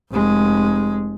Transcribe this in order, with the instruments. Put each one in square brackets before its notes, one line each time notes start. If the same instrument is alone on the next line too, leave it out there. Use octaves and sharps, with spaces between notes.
[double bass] F1 G#3